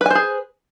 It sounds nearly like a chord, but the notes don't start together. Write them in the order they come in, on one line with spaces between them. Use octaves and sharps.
B4 G#5 C5 G#4